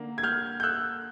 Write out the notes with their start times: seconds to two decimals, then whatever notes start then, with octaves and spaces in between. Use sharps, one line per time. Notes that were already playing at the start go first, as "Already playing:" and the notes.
Already playing: D3 A#3
0.18 G#6
0.23 F6 G6
0.60 G6
0.63 E6 F#6